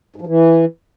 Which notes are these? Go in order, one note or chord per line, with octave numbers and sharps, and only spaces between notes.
G#2
F3
E3